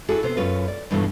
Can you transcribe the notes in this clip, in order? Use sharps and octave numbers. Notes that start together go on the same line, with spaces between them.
E4 F#4 G#4 A4
C3 B3 C5
F#2 C#4 F4 B4
D5
G2 B2 E3 F3 G3 A3